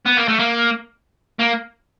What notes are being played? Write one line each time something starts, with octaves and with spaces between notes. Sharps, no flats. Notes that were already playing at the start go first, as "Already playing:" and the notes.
B3
A#3
A3
A#3
A#3